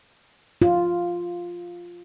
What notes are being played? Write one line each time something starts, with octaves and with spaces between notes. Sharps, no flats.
F4